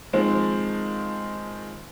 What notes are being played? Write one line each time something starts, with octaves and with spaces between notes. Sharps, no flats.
D#3 F3 G#3 C4